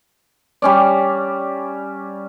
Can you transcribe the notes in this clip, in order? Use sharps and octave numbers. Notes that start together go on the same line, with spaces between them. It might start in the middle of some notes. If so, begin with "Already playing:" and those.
G3 C#4 D5